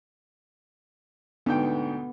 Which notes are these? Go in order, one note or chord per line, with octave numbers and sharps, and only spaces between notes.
D2 G#2 B3 G5